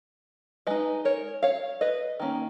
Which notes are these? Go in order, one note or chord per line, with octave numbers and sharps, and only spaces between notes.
G#3 D#4 B4 D#5
A#4 C#5
C#5 F5
B4 D#5
D#3 A#3 C#4